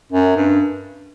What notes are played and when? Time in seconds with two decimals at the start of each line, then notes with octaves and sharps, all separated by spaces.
0.12 F#2
0.37 G2